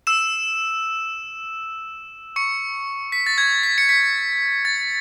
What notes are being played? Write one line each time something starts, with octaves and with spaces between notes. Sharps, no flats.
E6 E7
C#6 C#7
B6
A6
G#6
B6
C#7
B6
A6